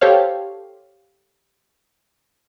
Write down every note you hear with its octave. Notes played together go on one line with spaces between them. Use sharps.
G4 A4 C5 C#5 F5